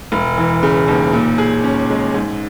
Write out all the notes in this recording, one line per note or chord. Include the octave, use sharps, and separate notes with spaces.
E1
E3
C#3
D#2
A#2
G#4
C#4
G#3
G#2